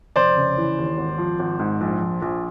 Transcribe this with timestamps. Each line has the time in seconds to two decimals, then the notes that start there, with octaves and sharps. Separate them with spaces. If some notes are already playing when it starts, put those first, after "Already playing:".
0.16 F1 C5 D5
0.36 C#3
0.57 E3
0.78 D#2
0.98 G#1
1.18 F3
1.39 G#1
1.59 G#2
1.81 A#1
2.01 F3
2.22 A#1